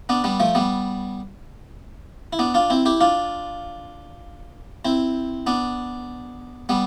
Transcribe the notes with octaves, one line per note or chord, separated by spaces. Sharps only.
B3 D4
G3 B3
F3 A3
G3 B3
E4
B3 D4
D4 F4
C4 E4
E4 G4
D4 F4
C4 E4
B3 D4
G3 B3